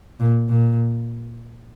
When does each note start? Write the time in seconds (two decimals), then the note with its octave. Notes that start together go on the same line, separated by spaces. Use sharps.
0.20 A#2
0.49 A#2